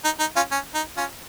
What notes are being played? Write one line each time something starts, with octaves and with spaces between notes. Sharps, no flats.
D#4
D#4
C#4 F4
C#4
D#4
C#4 F4